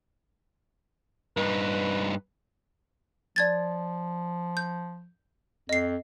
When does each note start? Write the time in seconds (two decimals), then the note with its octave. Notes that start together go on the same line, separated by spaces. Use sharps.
1.37 G2 D#4 B4
3.36 F3 D5 G#6 A6
4.57 G6
5.69 F2 D#5 C7